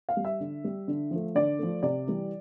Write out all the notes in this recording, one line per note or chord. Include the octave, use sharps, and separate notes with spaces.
F5
G3
E5
D3
G3
D3
F3 A3
D3 D5
F3 A3
C3 D5
E3 G3